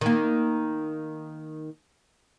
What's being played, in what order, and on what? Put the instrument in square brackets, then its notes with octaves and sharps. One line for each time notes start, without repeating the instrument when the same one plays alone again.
[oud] D#3 A#3